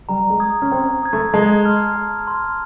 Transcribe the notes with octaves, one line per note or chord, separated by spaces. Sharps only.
G3 A#5
G#3
D#6 G#6
C#4
C4 A#5
D#6 G#6
A3
G#3 A5
C6 F6
A5
C6 F6